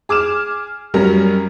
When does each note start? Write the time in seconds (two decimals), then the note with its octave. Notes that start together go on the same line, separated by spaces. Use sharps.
0.09 G#4 D6 F6 E7
0.94 F#2 F#3 G3 C#4 A#4 A#5